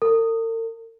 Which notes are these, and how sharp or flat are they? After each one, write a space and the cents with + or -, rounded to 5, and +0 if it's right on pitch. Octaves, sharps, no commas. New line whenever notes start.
A#4 -45